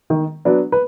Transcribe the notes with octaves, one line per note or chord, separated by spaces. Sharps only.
D#3
F#3 B3 D4
B4